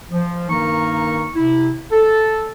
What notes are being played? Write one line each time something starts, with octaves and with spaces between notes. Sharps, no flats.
F3
G2 D#3 A#3 D#4 A#4 C#6
C3 E4
A4